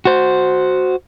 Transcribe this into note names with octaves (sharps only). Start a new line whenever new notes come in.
F#4 C5